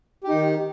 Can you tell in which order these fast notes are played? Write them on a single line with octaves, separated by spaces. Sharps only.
G4 D#4 D#3